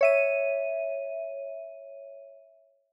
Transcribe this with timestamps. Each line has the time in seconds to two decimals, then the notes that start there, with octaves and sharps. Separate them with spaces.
0.01 C#5 E5 D#7